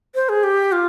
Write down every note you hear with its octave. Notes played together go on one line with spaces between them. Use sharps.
C5
G#4
G4
F4